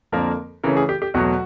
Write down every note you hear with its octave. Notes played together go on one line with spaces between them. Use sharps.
F2 D3 F3 A#3 A#4
C#3 E3 A3 C#4 A#4
G#4
G4
G4
E2 B2 F#3 A3 F#4